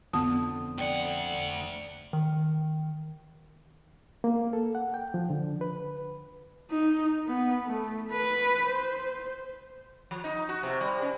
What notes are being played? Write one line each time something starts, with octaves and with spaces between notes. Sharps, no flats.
F2 D3 F3 B3 A5 D#6
D2 D5 F#5 G5
D#3
A#3
A4
F#5
G5
F3
D3
B4
D#4
B3
A3
B4
C5
F3
D#4
F#4
C3
G3
C#4